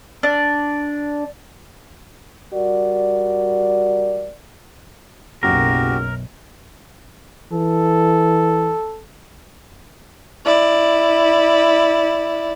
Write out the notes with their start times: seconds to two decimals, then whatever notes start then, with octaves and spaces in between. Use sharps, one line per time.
0.23 D4
2.54 G3 F#4 A#4 D5
5.43 F#1 B1 F#2 F#4 G4 A#4
7.52 E3 A4
10.45 E4 D5